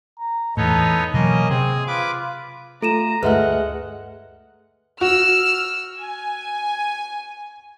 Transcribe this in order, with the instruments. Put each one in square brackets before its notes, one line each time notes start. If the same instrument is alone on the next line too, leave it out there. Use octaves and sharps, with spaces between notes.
[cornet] A#5
[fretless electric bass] E2 A2 [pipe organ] B3 D#4 C#5 [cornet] A4
[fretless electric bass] B2 E3 F#3 [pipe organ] A#3 D#5 [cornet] C#4
[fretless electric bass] C3 [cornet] C4 [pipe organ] G#4
[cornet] F4 [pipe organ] B4 D6
[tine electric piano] A3 F4 [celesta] A4 D#7 E7 [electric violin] A#5
[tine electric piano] D2 G2 F6 [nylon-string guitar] G#3 A3 [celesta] B4 E5 [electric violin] F#5
[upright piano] F#4 [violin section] E6 F6
[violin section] G#5